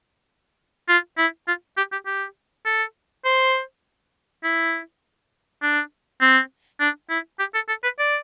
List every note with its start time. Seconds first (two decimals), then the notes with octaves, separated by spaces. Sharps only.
0.88 F4
1.18 E4
1.48 F4
1.77 G4
1.92 G4
2.06 G4
2.66 A4
3.25 C5
4.44 E4
5.62 D4
6.21 C4
6.80 D4
7.10 E4
7.39 G4
7.55 A4
7.69 A4
7.84 B4
7.99 D5